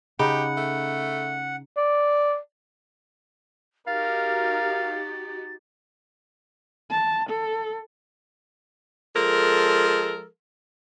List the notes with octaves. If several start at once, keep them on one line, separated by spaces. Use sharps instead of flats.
C#3 D#4 G4 F#5 B5
A3
D5
D#4 F#4 G4 A#4 F5 A6
A5
A4
F3 G#3 A4 A#4